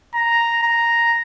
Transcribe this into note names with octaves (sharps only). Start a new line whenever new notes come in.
A#5
A#5